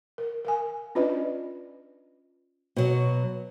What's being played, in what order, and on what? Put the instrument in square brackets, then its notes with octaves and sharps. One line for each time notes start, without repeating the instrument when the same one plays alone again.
[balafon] A#4
A#4 F5 G#5
C#4 D4 F4 B4 D5 D#5
[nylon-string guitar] B2 F#3